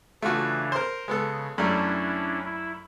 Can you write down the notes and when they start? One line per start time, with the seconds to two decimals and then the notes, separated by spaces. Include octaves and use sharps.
0.22 C#3 E3 A3 D4 F4 F#4
0.72 A#4 C5
1.08 C#3 G#3 B3 A4
1.58 F#2 G3 A3 C#4 D4 E4
2.45 E4